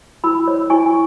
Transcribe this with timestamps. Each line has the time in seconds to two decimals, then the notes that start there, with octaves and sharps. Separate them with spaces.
0.24 E4 B5 E6
0.48 C#5
0.70 E4 G#5 C#6